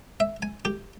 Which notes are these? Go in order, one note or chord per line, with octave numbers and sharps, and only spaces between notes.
E5
G#5
G4